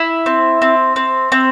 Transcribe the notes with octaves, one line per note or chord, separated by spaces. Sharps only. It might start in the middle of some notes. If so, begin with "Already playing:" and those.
Already playing: E4 E6
C4
C4
C4
C4